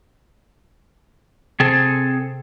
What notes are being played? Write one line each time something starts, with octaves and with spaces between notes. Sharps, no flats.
C3 C4 G#4 A4